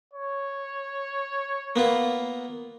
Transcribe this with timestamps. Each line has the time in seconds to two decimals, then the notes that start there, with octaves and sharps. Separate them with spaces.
0.13 C#5
1.76 A#3 B3 F4